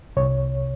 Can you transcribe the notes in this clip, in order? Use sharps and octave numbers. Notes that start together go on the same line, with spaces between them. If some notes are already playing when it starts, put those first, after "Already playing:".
C2 C#5